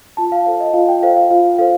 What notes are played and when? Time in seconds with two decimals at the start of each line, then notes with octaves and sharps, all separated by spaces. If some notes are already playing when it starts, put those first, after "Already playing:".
0.17 F4 A5
0.32 F5
0.46 A4 C5 F5
0.60 D#5
0.74 F4 F5
0.88 G5
1.02 A4 C5 F5
1.17 F5
1.30 F4 F5
1.59 A4 C5 F5